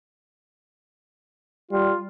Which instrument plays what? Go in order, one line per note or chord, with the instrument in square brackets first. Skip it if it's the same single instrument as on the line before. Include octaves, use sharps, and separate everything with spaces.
[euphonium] G3 [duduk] F4